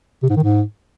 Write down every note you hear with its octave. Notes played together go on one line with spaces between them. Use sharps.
C3
G#2
D#3
G#2